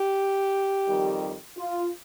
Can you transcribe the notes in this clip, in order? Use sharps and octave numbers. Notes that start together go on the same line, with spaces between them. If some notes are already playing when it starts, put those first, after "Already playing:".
Already playing: G4
F2 D#3 G3
F4